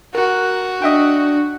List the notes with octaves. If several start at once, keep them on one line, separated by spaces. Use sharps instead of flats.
F#4 A#4
D4 D#5 E5 G5